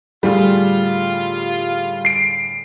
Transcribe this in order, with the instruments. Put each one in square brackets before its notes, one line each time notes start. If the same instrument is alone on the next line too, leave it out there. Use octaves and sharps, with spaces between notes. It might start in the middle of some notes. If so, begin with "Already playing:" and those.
[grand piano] A2 D3 G#4 [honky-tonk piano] G3 [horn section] F4
[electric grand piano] C7 D7